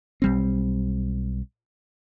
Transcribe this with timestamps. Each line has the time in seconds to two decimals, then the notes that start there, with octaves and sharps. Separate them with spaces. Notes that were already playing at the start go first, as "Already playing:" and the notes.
0.22 B1 G3 C4